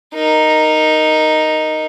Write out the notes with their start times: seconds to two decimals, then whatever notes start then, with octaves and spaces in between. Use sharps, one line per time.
0.14 D#4 A#4